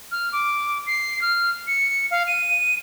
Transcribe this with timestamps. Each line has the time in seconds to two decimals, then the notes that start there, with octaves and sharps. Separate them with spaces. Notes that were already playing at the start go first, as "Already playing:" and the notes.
0.12 F6
0.32 D6
0.87 C7
1.22 F6
1.67 C#7
2.11 F5
2.27 D#7